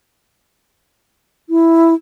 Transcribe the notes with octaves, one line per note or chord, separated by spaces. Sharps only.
E4